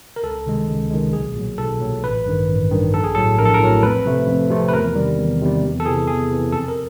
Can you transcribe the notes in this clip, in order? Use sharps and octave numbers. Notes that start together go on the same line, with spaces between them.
A#4
C#2 A4
C3 D#3 G#3
C#2
C3 D#3 G#3
B1 G#4
A#2 F#3
B1 A4
A#2 F#3
A1 B4
G2 D#3
A1
G2 D#3
A#1 A4
G#4
A2 F#3 A4
A#1 A#4
A4
A#4
A2 F#3
F2 B4
C3 F3 A3
F2
C3 F3 A3
B4
E2 A#4
C3 D#3 G3
E2
C3 D#3 G3
E2
A4
C3 E3 G#4
E2 G#4
C3 E3
F2 A4
A#4